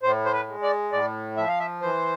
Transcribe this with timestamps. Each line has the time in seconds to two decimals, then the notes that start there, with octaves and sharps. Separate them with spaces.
0.03 A2 C5
0.25 C5
0.32 B4
0.47 G#3
0.62 D5
0.92 A2 D5
1.37 F3 E5
1.48 F5
1.60 E5
1.82 E3 C5